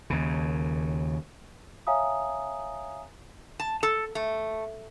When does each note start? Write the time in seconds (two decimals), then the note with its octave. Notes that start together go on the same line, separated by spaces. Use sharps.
0.10 D#2 C#3
1.87 C#5 E5 F5 G#5 A#5 D#6
3.60 A5
3.83 A4
4.15 A3